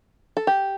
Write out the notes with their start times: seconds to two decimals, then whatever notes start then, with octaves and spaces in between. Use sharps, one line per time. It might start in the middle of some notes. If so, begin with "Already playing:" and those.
0.37 A4
0.47 G4